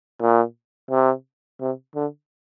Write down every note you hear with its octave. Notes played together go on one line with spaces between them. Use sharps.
A#2
C3
C3
D3